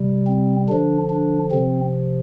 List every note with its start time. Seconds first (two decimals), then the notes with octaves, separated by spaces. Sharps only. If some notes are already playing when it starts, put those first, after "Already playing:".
Already playing: C3 G3
0.27 C4
0.69 D3 F3 D4
1.10 D4
1.52 C3 F3 C4